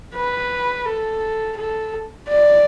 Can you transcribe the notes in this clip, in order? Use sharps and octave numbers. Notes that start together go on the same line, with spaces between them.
B4
A4
A4
D5